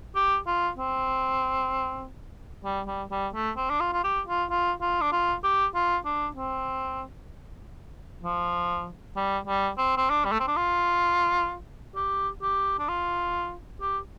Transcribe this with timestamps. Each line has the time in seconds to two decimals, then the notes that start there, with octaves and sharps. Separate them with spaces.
0.16 G4
0.47 F4
0.77 C4
2.65 G3
2.87 G3
3.11 G3
3.35 A3
3.57 C4
3.70 D4
3.81 F4
3.93 F4
4.04 G4
4.28 F4
4.50 F4
4.82 F4
5.01 D4
5.12 F4
5.44 G4
5.75 F4
6.05 D4
6.37 C4
8.23 F3
9.16 G3
9.48 G3
9.78 C4
9.97 C4
10.10 D4
10.25 G3
10.32 A3
10.40 C4
10.48 D4
10.57 F4
11.96 G4
12.42 G4
12.79 D4
12.89 F4
13.81 G4